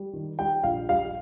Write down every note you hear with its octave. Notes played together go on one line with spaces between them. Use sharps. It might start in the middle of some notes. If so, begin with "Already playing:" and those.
Already playing: G3
D#3
G3 G5
A#1 F5
G3 F5